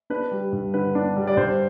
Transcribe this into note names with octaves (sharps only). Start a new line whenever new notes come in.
D4 B4
G3
G2
D3 B4
D4
G3
D5
G2 C5